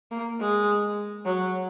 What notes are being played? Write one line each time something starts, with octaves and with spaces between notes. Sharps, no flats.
A#3
G#3
F#3